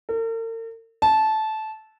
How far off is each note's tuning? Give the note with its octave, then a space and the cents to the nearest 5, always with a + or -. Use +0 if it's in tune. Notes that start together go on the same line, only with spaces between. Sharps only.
A#4 -45
A5 -15